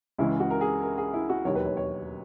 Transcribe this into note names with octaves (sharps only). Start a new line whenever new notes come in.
C#2 C#3 E3 G#3 E4
F#4
A#4
G#4
A#4
G#4
E4
F#4
E1 D#2 D#3 F#3 C#5
B4
C#5
C#5